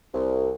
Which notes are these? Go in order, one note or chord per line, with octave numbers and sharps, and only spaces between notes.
C2